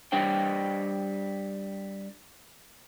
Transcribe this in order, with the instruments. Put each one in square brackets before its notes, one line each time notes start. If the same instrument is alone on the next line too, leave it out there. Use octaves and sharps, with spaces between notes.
[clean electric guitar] G3 D4 C5 G5